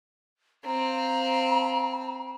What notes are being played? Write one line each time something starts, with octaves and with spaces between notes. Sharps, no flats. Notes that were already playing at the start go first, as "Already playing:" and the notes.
C4 F5 A#5